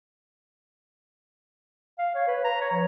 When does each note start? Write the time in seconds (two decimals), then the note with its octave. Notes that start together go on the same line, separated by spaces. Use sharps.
1.99 F5
2.15 C#5
2.27 B4
2.45 A#5
2.61 C#5
2.73 F3